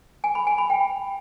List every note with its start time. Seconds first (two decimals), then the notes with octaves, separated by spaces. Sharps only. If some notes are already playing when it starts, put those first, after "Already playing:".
0.24 G#5
0.35 B5
0.47 G#5
0.58 B5
0.70 G5